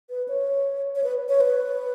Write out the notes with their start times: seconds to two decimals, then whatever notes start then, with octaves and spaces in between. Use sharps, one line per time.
0.10 B4
0.28 C#5
0.95 C#5
1.04 B4
1.29 C#5
1.41 B4